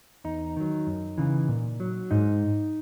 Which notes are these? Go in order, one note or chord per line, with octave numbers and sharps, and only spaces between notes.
E2 D#4
D#3 F#3
F#2
C#3 E3
A#2
F#3
G#2 D#4